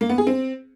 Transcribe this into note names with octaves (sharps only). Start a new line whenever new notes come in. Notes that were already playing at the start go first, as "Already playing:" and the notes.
A#3
B3
G#4
C4